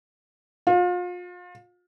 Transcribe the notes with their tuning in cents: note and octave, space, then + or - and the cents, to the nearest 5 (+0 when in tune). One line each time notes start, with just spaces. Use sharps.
F4 +35